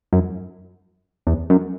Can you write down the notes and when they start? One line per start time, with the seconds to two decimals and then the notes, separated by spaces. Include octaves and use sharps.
0.13 F#2
1.27 E2
1.50 F#2